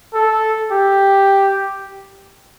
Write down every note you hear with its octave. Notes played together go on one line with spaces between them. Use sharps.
A4
G4